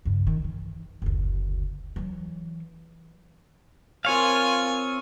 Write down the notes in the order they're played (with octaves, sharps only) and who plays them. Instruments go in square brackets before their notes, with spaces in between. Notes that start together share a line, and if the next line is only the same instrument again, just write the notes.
[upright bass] G2 C#3
D#3
E3
F#1 D2
E3 F#3
[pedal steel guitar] C4 C#5 F5 [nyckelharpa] F4 A#4 [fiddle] G#5